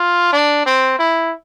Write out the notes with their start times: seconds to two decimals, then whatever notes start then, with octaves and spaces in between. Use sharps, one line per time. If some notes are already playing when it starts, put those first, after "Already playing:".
Already playing: F4
0.33 D4
0.66 C4
0.99 E4